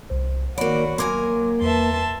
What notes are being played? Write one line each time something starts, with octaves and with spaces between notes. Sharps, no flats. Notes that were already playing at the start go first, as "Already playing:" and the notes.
C2 C5
D#3 A#3 F#4 C#5 D5 B5
F#3 A#3 A#4 G#5 C6 D6 G#6
E2 B4 E5 A5 C6